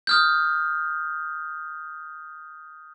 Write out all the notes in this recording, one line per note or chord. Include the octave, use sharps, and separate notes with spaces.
D#6 F6 G6